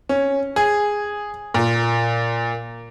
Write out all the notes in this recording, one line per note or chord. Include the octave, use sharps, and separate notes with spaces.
C#4
G#4
A#2